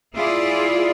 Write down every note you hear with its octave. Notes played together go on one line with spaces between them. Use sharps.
E4 F4 G#4 D5